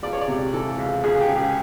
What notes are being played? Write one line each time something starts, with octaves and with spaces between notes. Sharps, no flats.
C#2 D5
C#5
D5
C3
E3 A4
C#2
C#2 G#4
G#4
G4
C#3
G#4